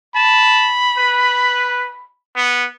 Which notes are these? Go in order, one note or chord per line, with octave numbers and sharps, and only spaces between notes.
A5 B5
B4
B3